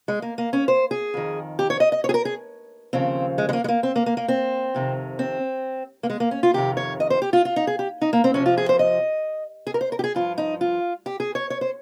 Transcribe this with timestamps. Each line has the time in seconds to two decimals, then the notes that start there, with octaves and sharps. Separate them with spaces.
0.08 G#3
0.22 A#3
0.38 A#3
0.53 C#4
0.68 C5
0.91 G#4
1.14 F2 D#3
1.59 G4
1.70 C#5
1.80 D#5
1.92 D#5
2.04 C#5
2.09 G#4
2.14 A#4
2.25 G#4
2.93 D#2 C#3 F3 C4
3.38 G#3
3.49 G#3
3.53 A#3
3.64 G#3
3.68 A#3
3.83 C4
3.96 A#3
4.06 A#3
4.17 A#3
4.28 C4
4.75 F2 C3 D#3
5.19 C4
6.03 A#3
6.10 G#3
6.20 A#3
6.31 C#4
6.43 F4
6.54 F2 C3 D#3 G4
6.77 C#5
7.00 D#5
7.10 C5
7.22 G4
7.33 F4
7.45 F4
7.56 D#4
7.67 G#4
7.79 G4
8.02 D#4
8.13 A#3
8.24 C4
8.34 F2 C3 F3 C#4
8.46 F4
8.57 G#4
8.69 C5
8.79 D#5
9.67 G#4
9.74 A#4
9.81 C5
9.92 A#4
9.99 G4
10.04 G#4
10.15 G2 F3 F4
10.38 D#4
10.61 F4
11.06 G4
11.20 G#4
11.35 C#5
11.50 C#5
11.61 C5